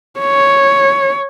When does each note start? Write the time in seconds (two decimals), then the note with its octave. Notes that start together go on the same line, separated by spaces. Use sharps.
0.20 C#5